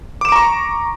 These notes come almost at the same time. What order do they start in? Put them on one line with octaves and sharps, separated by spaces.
D6 E7 D7 A#5 C#6